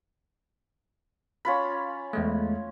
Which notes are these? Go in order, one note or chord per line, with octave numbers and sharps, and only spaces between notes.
C#4 F4 B5
E2 G#3 A3